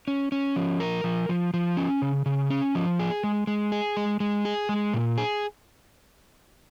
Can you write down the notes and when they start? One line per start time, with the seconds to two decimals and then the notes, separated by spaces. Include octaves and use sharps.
0.08 C#4
0.32 C#4
0.56 F3
0.80 A#4
1.04 F3
1.29 F3
1.54 F3
1.77 C#4
2.02 C#3
2.26 C#3
2.50 C#4
2.75 F3
2.99 G#4
3.24 G#3
3.47 G#3
3.72 G#4
3.97 G#3
4.20 G#3
4.45 G#4
4.69 G#3
4.94 A#2
5.18 G#4